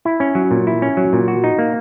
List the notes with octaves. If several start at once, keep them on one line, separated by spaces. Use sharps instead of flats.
E4
C#4
F#3
A#2
E4
C#4
F#3
A#2
F#4
D#4
A#3